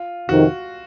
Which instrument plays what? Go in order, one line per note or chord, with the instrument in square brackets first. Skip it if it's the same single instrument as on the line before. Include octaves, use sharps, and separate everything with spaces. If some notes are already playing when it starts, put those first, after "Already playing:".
Already playing: [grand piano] F4
[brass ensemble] F2 C3 D#3 [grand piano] F#4